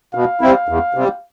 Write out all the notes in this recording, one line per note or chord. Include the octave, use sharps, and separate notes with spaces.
B2 F5
G3 C4 E4
E2
C3 G3